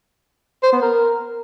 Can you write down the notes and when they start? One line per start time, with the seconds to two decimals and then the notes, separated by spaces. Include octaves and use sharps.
0.63 C5
0.72 B3
0.82 A#4